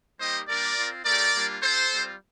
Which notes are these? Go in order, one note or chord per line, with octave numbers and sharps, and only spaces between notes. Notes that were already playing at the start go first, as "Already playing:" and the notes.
G3 A#3 D#4 G4 C5 D#5
G3 A#3 D4 G4 A#4 D5
C4 F4
A3 D#4 G4 A#4 D5
G3 A#3 D4 F4
C4 F4 A4 C5
G3 C4 F4